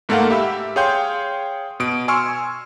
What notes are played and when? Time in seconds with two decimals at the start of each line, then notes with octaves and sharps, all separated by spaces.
0.09 G#2 A3 A#3 A4 F5 F#5
0.30 G4 E5 B5 E6
0.76 G#4 C#5 F5 G5 C6 G6
1.80 B2 D#6 D7
2.08 G#5 C6 C#6 E6 F6